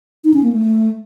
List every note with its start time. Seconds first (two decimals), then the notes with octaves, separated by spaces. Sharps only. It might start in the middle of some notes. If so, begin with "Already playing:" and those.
0.24 D#4
0.34 C#4
0.43 A#3
0.52 A3